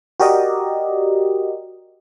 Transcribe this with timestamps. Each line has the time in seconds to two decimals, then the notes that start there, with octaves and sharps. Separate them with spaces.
0.20 F#4 G4 A#4 D5 D#5